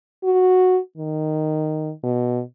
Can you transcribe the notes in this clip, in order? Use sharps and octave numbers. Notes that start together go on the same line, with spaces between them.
F#4
D#3
B2